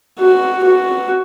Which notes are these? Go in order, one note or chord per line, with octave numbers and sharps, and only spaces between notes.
F#4
F#4